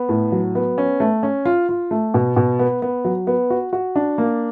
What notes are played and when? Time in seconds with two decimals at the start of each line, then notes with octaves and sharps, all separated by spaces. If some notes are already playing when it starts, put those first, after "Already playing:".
Already playing: B3
0.09 A2
0.32 F#3
0.55 B3
0.78 C#4
1.00 A3
1.23 C#4
1.45 F4
1.69 F4
1.91 A3
2.14 B2
2.36 B2
2.59 B3
2.82 B3
3.05 F#3
3.27 B3
3.50 F#4
3.73 F#4
3.96 D4
4.18 A#3